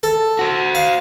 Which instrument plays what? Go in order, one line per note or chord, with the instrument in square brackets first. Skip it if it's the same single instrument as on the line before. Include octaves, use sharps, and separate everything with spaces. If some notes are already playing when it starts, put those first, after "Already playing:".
[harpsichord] A4
[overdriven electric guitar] F#4 C5
[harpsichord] F5